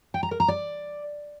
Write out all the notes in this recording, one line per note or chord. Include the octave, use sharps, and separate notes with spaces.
G5
A#5
A#4
A#5
D5